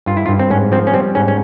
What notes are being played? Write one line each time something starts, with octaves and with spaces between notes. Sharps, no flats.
G2 F4
E4
F4
G2
C4
G#2 C#4
F3 C4
C#4
G3 C4
G#2 C#4
C#4